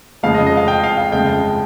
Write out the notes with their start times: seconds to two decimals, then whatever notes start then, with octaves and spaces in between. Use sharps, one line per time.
0.23 F1 F2 C#3 F3 G#3 F5
0.34 D#5
0.46 D#5
0.57 F5
0.68 G5
0.84 F5
0.98 F5
1.12 G1 F2 C#3 G#3 G5